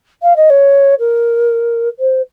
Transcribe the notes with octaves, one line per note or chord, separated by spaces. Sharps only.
F5
D#5
C#5
A#4
C5